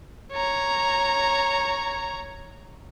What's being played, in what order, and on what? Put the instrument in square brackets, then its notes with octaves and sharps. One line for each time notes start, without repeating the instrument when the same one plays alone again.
[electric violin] C#5 A#5